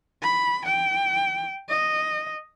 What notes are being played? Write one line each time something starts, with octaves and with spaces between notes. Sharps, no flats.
B5
G5
D#5